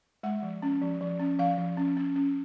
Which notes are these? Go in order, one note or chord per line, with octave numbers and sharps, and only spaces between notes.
G#3 F#5
F3
C#4
F3
F3
C#4
F3 F5
F3
C#4
C#4
C#4